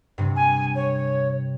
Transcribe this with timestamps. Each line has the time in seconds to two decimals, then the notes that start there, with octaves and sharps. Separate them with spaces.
0.18 G2 C3
0.35 G#5
0.75 C#5